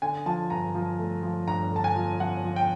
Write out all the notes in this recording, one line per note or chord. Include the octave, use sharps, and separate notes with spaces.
D3 G#5
F3 A5
G2 A#5
F3
A3
F3
G2 A#5
D3 A5
G#5
F3
F3 F#5
F3
G5